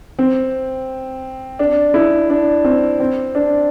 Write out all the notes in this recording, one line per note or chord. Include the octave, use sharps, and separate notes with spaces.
C4
D4
E4
D4
C4
C4
D4